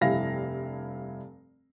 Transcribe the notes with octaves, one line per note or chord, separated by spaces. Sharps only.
F1 G2 E4 F5 A#6